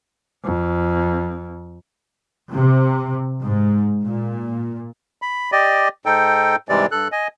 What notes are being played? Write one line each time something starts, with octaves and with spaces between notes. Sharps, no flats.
F2
C3
G#2
A#2
B5
G4 D5 D#5
G#2 D#4 A4 G5
G#2 C3 E3 G3 G#3 D5
G2 A4 F#6
D#5 G#5